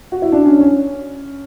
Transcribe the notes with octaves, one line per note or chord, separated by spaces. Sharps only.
F#4
E4
D4
C#4
C#4